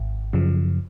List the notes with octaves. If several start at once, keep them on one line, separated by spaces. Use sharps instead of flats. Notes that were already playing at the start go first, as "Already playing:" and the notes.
Already playing: G#1
F#2 C#3 F3